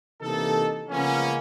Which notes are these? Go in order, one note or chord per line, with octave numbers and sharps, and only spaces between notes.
C3 E3 A#3 D#4 A4
C#3 F3 G#3 A#3 B3 C#4